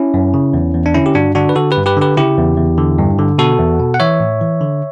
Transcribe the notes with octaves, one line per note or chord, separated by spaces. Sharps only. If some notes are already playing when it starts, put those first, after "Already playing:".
Already playing: C#4 E4
F#2
C#3
E2
E2
D4
D3 C#4 E4
G4
G2 D4 F#4
D3 D4 F#4
B4
D3 F#4 A4
G4 B4
G2
G4 B4
D3 G4 B4
C#3 E4 G4
E2
E2
D3
G2
D3
B2 F#4 A4
E2
B2
F#5
E3 C#5 E5
A2
E3
D3